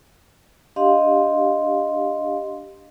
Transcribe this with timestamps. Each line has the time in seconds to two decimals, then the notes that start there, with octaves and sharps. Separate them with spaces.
0.76 D4 G4 D#5 F5 C6